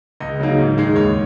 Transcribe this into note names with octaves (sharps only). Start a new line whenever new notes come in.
C#2 D#5
C#3 F#3 A#3 D#4
G#2
D#3 G#3 D#4
D#2 C#5